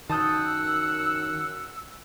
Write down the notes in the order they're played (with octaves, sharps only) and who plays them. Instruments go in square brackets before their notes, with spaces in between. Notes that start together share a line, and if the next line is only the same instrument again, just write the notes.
[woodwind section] F#2 E6 [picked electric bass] D#3 [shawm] F#5 [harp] A5 D#6 G6